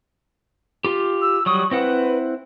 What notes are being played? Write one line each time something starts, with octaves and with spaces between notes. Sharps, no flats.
F4 G4
E6
F#3 G3 C#6 D#6
C4 E4 B4 F#5